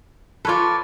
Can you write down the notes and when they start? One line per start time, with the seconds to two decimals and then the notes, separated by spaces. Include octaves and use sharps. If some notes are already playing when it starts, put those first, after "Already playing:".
0.45 F4 A4 B4 C#5 D5